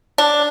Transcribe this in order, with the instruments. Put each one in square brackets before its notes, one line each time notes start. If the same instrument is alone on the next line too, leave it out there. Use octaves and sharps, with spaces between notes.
[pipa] D4